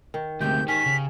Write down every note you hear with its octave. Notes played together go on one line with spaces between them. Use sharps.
D#3
D2 G#2 C3 G4 G6
D#3 C#4 B6
C#3